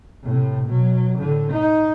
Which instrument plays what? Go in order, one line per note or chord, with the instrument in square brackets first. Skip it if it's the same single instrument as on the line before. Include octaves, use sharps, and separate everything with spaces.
[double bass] A2 C3
B2 F#3
A2 D3
D#4